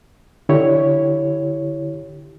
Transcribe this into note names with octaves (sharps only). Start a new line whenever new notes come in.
D3 E4 G4 C#5